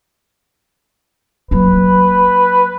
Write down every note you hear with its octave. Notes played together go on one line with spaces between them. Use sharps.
F#3 A#3 B4